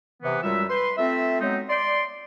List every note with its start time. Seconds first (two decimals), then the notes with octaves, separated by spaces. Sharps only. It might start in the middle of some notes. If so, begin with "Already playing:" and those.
0.23 C3 E3 B3
0.43 F#2 G3 G#3 F4 E5
0.70 B4 C6
0.97 A3 C4 F4 E5
1.41 F#3 G#3 B3 C4 D#4
1.69 D5 C6